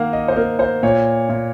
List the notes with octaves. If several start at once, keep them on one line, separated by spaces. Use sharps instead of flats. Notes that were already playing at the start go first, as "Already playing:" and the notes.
Already playing: D#3 A#3 A#4 F5 F#5
D#5
C5
A#3 A#4
C5
A#2 C#5
A#2